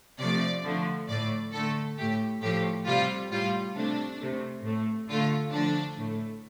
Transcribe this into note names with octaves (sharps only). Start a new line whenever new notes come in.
C3 F3 A3 D5
D3 F3 A3
A2 A3 D5
D3 A3 A4
A2 A3 G4
A2 F3 A3 G4
C3 G3 F4
A2 G3 F4
C3 A3 D4
C3 A3
A2 A3
D3 A3 F4
D3 F3 A3 D4
A2 A3